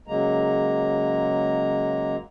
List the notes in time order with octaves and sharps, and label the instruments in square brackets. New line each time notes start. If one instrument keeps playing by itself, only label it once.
[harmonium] C#3 F#3 G#3 A#3 A#5